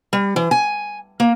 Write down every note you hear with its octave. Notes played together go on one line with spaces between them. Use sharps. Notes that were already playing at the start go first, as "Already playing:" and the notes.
G3
E3
G#5
A#3